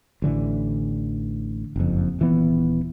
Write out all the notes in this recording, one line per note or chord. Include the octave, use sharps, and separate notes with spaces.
A1 D3 E3
F#1 F2
D#1 E3 B3